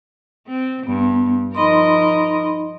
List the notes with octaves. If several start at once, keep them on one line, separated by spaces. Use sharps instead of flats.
C4
G2 B3
F3 D#4 A#4 D#5 B5 C6